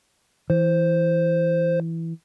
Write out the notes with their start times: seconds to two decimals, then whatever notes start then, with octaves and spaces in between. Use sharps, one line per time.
0.50 E3 C5